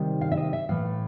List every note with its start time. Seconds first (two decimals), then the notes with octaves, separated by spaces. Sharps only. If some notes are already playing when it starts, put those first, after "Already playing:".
Already playing: C3 D#3 G3
0.21 F5
0.32 E5
0.37 D#5
0.53 E5
0.69 A2 E3 A3 F5